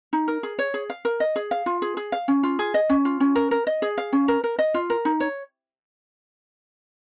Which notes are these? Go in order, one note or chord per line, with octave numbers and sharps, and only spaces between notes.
D#4
A#4
G#4
C#5
G#4
F5
A#4
D#5
G#4
F5
F4
G#4
G#4
F5
C#4
F4
G#4
D#5
C#4
F4
C#4
A#4
A#4
D#5
G#4
F5
C#4
A#4
A#4
D#5
F4
A#4
D#4
C#5